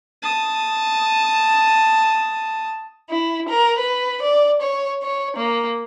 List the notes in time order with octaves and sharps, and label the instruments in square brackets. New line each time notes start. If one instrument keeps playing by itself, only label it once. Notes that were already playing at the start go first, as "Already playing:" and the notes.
[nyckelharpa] A5 D#6
[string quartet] E4
A#4
B4
D5
C#5
C#5
A#3